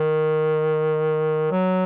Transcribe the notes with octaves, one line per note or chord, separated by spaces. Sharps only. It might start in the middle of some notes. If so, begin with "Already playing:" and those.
Already playing: D#3
F#3